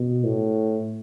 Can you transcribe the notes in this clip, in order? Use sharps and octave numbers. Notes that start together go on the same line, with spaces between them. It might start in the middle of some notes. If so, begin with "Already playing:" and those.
Already playing: B2
A2